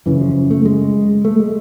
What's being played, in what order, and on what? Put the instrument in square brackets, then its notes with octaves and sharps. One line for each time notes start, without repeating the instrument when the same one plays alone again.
[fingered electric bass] F#2 C#3 E3
F3
A3
G#3
A3
G#3